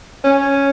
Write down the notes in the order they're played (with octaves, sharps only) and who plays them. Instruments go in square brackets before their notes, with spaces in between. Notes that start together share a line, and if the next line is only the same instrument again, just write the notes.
[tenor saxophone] C#4